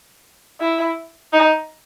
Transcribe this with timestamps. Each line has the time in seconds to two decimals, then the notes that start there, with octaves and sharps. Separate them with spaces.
0.60 E4
1.32 D#4